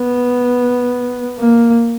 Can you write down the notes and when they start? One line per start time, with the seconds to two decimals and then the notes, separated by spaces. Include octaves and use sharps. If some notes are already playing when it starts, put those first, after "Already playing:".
Already playing: B3
1.39 A#3